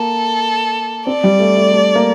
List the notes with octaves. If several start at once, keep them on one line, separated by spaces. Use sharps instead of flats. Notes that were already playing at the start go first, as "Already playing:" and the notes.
Already playing: A#3 A4
C4 D5
G3
A3
A3
A3
A#3